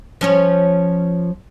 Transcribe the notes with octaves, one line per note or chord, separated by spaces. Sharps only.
F3 C#4 C#5